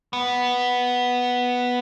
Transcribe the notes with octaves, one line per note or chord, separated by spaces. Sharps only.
B3